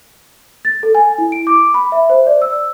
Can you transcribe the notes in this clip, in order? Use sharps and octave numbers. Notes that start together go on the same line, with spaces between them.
A6
A4
G#5
E4
D7
D6
B5
E5
C5
D5
E6